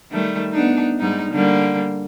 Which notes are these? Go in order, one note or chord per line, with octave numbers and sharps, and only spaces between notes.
D#3 G3 A3
B3 D4 D#4
G#2 G3 D#4
D3 G3 A#3